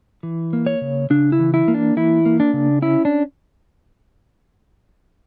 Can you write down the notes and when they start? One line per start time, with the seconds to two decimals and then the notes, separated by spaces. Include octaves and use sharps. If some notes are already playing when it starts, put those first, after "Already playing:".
0.23 E3
0.53 A#3
0.66 C#5
0.81 C#3
1.10 C#3 D4
1.32 E4
1.40 E3
1.54 E4
1.68 A#3
1.74 D4
1.97 E3 E4
2.25 A#3
2.40 D4
2.53 C#3
2.82 C#4 E4
3.05 D4